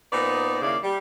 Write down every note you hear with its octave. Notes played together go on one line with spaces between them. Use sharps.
A#2 B3 D#4 C5 D5
D#2 C#3 A#3 E4 D5
G3